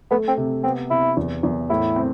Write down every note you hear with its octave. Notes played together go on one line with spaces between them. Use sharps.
A3 B3
C4
C3
B3 C4
C3 E4
E2
E2
A2 E4
C4